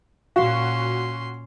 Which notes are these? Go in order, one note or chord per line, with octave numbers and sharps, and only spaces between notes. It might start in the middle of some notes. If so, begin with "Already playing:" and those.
A#2 C#4 F#4 F5 C6